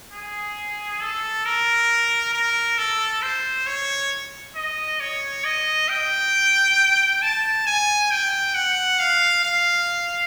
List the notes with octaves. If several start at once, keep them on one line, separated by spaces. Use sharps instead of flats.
G#4
A4
A#4
A#4
A4
C5
C#5
D#5
C#5
D#5
G5
A5
G#5
G5
F#5
F5
F5